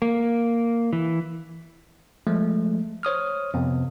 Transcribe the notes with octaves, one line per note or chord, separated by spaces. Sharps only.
A#3
E3
F3 G#3 A3
C5 C#5 D#6 F6
F2 C3 B3